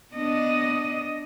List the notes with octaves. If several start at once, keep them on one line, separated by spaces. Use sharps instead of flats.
B3 D4 D#5